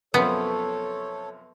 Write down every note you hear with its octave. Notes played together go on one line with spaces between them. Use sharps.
F#2 C3 F3 B3 A4 C#5